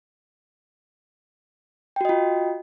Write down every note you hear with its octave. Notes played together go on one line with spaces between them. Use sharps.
F4 F#4 D#5 G5